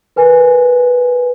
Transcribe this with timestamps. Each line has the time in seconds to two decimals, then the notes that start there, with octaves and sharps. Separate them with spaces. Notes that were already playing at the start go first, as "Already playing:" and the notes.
0.16 A#4 B4 G#5